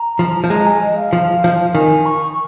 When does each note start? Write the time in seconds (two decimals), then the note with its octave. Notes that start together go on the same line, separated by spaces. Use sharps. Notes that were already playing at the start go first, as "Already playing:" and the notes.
Already playing: A#5
0.19 F3
0.44 F3
0.50 G#3 A#5
0.66 G#5
0.82 D#5
0.97 F5
1.13 F3
1.44 F3
1.75 D#3 G#5
2.06 C#6